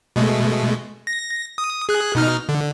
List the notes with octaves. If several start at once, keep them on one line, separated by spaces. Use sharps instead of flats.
B2 G#3 A3
A#6
D#6
G#4 F#6
B2 D#4 F6
D3